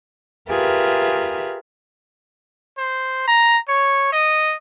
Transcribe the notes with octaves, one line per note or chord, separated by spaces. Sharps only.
F4 G4 G#4 A#4 B4 E5
C5
A#5
C#5
D#5